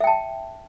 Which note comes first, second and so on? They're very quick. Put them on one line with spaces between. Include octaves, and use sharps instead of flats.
E5 G5 A5